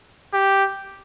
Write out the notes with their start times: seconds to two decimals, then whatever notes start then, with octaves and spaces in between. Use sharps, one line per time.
0.34 G4